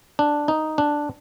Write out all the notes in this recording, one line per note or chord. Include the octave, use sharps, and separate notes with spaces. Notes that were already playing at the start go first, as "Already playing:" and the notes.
D4
D#4
D4